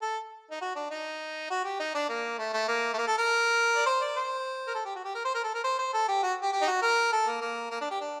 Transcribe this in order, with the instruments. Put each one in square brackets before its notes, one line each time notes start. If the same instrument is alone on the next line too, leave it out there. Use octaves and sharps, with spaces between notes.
[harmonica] A4
D#4
F#4
D4
D#4
F#4
G4
D#4
D4
A#3
A3
A3
A#3
A3
A#3
A4
A#4
D5
C5
D5
C5
A#4
A4
G4
F#4
G4
A#4
C5
A#4
A4
A#4
C5
C5
A4
G4
F#4
G4
G4
D#4
F#4
A#4
A4
A#3
A#3
A#3
D4
G4
D4